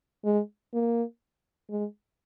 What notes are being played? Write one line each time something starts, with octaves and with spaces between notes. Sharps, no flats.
G#3
A#3
G#3